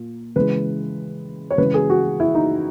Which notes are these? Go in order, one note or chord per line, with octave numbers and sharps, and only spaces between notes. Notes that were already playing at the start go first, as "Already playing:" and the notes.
Already playing: A#2
C#3 E3 G#3 B4
C#5
C#3 E3 G#3 B4
G#4
F#4
E4
D#4